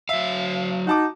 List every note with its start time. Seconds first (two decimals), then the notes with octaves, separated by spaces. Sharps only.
0.09 F#3 E5 F5
0.87 D#4 F#4 A5 D6